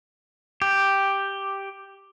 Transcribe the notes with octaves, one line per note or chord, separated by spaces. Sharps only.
G4